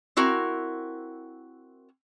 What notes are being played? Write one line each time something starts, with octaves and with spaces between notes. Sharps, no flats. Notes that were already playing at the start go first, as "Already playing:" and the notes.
C4 E4 F#4 A#4